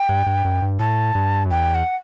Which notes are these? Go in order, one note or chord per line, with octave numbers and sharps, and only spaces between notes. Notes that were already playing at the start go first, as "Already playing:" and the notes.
Already playing: G5
G2
G2
F#2
G2
A2 A5
G2
F#2
E2 G5
F#5